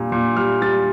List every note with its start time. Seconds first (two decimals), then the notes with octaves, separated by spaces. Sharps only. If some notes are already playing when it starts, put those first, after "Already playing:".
Already playing: A#2 G3
0.12 A#2
0.36 G3 F6
0.62 G3 A6